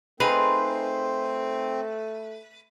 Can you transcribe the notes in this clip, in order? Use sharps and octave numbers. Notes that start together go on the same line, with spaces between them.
A3 C4 D#4 F4 G#4 B4